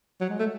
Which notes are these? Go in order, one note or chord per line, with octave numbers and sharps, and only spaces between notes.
F#3
G#3
A3